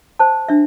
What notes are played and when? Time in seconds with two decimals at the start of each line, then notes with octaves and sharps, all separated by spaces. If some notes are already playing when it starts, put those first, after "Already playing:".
0.19 C5 A5
0.49 D4 E5